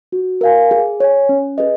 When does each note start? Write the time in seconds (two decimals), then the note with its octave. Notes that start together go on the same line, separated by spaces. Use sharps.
0.12 F#4
0.41 A#4 F5 G#5
0.71 G#4
1.00 C#5 G#5
1.29 C#4
1.58 G#4 B4 D#5